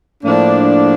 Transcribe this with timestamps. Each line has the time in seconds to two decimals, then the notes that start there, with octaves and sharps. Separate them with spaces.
0.24 A2 F3 A#3 D4